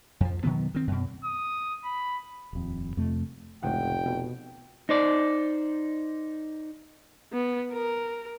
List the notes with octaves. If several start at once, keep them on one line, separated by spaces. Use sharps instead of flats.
F2 F3
B2 D#3 F#3 B3
D#3 C4
F#2 B2
D#6
B5
D#1 F2
F2 C3 A3
F1 C#2 A2 F#5 G5
B2
D#4 C5 D5
B3
A#4